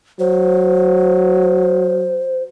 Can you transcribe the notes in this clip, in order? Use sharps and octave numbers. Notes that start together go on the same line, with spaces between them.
F#3 C5